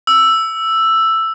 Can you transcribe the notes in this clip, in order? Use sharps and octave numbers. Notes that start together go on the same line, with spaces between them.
E6